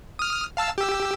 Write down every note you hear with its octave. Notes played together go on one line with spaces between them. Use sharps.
D#6 F6
F5 A5 E6
G4 E6